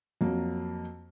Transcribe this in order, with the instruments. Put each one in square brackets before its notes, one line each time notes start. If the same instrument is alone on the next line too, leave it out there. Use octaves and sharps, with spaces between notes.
[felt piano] F2 F#3 A#3